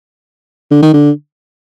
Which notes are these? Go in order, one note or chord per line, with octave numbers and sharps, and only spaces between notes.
D3
D#3
D3